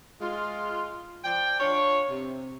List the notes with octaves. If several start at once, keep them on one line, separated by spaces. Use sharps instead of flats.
G#3 F4
F3 D5 G5
D4 F4 C#5
C3